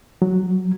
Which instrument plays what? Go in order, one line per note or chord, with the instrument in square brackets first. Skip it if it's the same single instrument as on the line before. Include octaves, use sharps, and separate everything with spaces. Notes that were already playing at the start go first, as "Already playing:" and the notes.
[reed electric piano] F#3